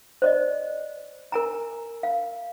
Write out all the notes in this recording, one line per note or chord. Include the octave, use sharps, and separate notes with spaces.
C5 D5 D#5
A#4 G#5 A#5
F5